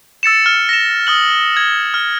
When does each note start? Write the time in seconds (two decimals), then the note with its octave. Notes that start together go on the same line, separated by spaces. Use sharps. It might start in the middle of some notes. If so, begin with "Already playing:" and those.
0.23 E6 A6 C#7 E7
0.46 F6
0.69 A#6 E7
1.07 D#6 F6 F#7
1.57 G#6
1.94 F6